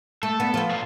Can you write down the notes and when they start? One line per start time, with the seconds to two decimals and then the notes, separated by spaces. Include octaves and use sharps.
0.23 A3 A4
0.40 B3 D4
0.54 F3 B3
0.70 A#2 A3 F4